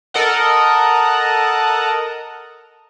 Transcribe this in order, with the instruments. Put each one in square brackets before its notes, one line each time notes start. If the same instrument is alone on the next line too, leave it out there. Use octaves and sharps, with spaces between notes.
[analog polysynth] A4 A#4 D#5 F#5